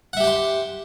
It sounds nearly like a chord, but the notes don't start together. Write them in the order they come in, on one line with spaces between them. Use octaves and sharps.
F#5 E5 G4 G5 C6